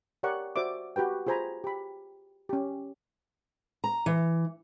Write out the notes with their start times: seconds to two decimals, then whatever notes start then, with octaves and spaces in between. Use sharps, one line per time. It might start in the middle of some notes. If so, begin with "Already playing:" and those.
0.23 G4 A#4 C#5 D5 F#5 C#6
0.56 F#4 C5 D5 E5 D6
0.96 F#4 G4 B4 G5
1.27 F4 G#4 C5 G#5 A#5 B5
1.64 G4 B5
2.49 C#4 G4
3.84 A#5
4.06 E3